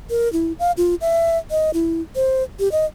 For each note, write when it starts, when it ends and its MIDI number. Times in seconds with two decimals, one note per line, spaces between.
0.10 0.31 70
0.33 0.52 64
0.59 0.72 77
0.77 0.95 65
1.01 1.38 76
1.51 1.71 75
1.74 2.01 64
2.16 2.43 72
2.59 2.71 67
2.72 2.85 75